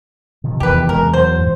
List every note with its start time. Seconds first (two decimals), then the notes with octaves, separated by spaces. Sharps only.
0.44 C3 D#3 F3
0.60 E2 G4 B4
0.89 F#2 C3 G#3 A#4
1.14 F#3 C5
1.38 F2 G#2